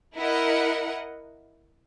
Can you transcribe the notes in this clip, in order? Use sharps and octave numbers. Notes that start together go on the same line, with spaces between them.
E4 A#4 D#5 F#5